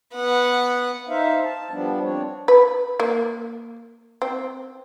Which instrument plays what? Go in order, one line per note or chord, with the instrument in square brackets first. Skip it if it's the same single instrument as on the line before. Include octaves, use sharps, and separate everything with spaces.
[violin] B3 F#5
[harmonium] D#4 C5 E5 F5
A5
F3 G3 B3 D4
C4 D4 C#5
[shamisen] B4
A#3
C4